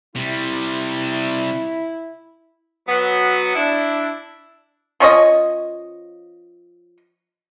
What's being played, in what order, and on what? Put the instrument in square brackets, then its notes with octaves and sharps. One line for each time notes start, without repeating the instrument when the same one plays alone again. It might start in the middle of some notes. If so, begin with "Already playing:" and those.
[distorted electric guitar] C3 G3 [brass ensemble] E4
[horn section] F#3 B3
D4 E4
[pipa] F3 C#4 C#5 D#5